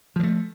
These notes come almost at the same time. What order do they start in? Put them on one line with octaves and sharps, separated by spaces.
F3 F#3 A3